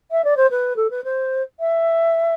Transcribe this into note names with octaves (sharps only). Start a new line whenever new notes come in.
E5
D5
C5
B4
A4
B4
C5
E5